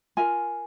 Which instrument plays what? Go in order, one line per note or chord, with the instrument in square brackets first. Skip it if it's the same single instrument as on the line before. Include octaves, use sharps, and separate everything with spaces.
[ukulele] F4 A#4 G#5